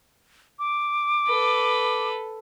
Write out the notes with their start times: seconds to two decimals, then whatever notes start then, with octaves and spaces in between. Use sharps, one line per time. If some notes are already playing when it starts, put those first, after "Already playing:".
0.59 D6
1.28 A4 B4